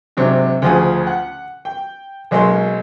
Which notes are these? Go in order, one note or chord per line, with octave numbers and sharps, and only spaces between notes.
G#2 C3 F#3 D4
D2 C#3 F3 G#4 D#6
F#5
G5
B1 F#3 G#3 A#3 C#4 C6